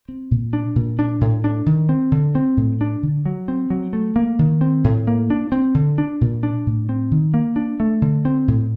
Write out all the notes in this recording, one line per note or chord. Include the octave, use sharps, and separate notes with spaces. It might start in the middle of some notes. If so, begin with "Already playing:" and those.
C4
A#2
D4
A#2
D4
A2
D4
D#3
C4
D3
C4
A2
D4
D3
F#3
C4
F#3
A3
A#3
D#3
C4
A2
A#3
D4
C4
D3
D4
A#2
D4
A2
C4
D#3
A#3
D4
A3
D3
C4
A2